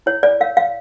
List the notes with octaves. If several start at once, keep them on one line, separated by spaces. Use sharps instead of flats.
E4 C#5
D5
A#4 C#5 F5
F5